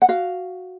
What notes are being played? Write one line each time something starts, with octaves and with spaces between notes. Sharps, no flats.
F#5
F#4 F5